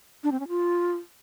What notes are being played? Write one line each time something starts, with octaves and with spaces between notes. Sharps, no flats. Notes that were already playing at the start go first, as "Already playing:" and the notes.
D4
C4
C#4
F4